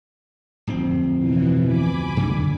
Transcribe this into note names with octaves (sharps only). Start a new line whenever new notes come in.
D1 F2 C4
B2 E3
G#5 B5 D6
F#2 D3